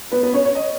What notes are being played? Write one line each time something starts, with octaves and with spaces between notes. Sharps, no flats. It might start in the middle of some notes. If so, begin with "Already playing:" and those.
B3 B4
B3 B4
C#4 C#5
C#5
D#5